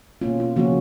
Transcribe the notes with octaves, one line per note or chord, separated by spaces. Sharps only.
B2 A#3 C#4 F4
F4
C#3 F3 A#3 C#4 F#4